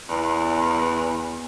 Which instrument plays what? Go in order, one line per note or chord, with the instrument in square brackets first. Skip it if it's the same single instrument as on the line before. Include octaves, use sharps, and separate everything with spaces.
[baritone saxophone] E2